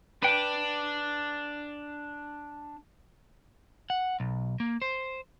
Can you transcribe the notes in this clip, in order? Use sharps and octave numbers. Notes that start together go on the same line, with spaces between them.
D4 B4 G5
F#5
B1
A#3
C5